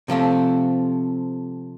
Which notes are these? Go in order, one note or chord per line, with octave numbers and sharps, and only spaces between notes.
C3 F3 A3 C4